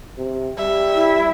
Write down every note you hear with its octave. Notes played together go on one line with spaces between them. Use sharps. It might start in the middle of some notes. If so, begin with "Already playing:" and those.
C3
G3 E5
E4